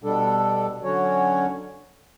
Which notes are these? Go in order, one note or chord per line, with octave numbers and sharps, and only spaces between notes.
B2 G3 D4 A4
D3 F#3 C#4 F#4 C#5